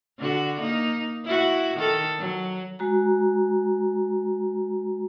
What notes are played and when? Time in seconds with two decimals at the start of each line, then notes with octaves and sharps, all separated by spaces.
0.18 D3 F#4
0.60 A#3 D#4
1.25 E4 F#4
1.76 D#3 A4
2.18 F#3
2.79 G#3 F#4 A#5